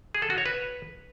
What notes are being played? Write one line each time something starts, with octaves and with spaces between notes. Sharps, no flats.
G#4
A4
F#4
C#5
B4